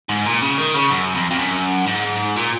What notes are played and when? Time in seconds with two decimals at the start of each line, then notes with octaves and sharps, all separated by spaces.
0.09 G#2
0.26 A#2
0.42 C#3
0.58 D#3
0.74 C#3
0.90 F#2
1.15 F2
1.31 F2
1.39 F#2
1.87 G#2
2.36 A#2